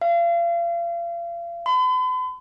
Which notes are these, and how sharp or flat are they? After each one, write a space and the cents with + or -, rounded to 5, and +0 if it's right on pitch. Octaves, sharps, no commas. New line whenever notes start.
F5 -35
B5 +45